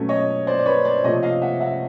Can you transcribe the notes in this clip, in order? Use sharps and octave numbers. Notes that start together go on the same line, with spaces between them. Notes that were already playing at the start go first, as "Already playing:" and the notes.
Already playing: B2 F#3 A3 C#4
C#5 D#5
C5 D5
D5
B4 C#5
C5 D5
C3 F3 A3 C#5 D#5
D#5 F5
E5 F#5
E5 F#5